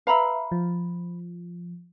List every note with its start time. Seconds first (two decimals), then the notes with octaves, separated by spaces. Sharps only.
0.07 B4 E5 F5 A#5 B5
0.52 F3